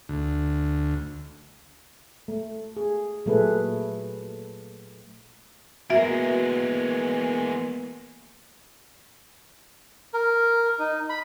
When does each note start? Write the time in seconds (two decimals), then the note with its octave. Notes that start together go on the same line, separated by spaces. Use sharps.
0.09 D2
2.28 A3
2.77 G#4
3.26 A#2 F#3 A3 G#4 A4 B4
5.90 E3 G#3 A#3 B3 F#4 A#4 E5
10.14 A#4
10.79 D#4
11.09 B5